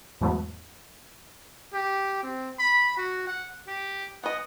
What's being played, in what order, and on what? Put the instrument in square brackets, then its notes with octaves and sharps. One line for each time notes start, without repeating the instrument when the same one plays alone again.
[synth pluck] E2 G#2 F#3 A3 B3
[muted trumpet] G4
C4
B5
F#4
F#5
[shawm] G4
[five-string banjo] B3 D#5 [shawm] F#5